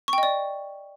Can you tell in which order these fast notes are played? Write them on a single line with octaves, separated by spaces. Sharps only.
C#6 G5 D#5 D5